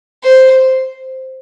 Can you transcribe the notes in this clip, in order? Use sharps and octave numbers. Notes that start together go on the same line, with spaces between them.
C5